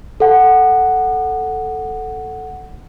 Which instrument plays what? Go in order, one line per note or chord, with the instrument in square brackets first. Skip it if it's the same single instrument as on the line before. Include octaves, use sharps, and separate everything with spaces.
[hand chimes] A4 F#5